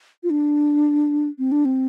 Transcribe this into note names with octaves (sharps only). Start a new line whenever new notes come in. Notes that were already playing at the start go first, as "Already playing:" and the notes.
F4
D4
C4
D4
C4